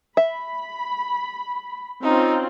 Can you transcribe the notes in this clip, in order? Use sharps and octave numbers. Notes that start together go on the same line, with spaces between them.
E5 B5
C4 C#4 D#4 F4